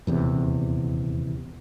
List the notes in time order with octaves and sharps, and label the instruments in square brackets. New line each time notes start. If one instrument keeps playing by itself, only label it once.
[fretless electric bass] D#1 E2 C3